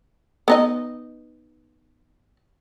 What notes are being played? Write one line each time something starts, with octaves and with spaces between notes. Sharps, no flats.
B3 D#4 D#5